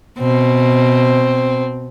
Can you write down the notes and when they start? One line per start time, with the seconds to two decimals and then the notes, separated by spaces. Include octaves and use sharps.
0.19 B2 C4